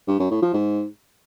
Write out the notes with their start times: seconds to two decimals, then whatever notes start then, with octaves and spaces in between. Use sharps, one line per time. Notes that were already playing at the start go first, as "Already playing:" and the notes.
0.08 G2
0.19 F#2
0.31 A2
0.42 F3
0.53 G#2